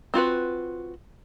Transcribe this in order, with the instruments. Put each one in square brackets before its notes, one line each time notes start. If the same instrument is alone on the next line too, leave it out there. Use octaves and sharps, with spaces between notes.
[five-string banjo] C4 F4 F#4 B4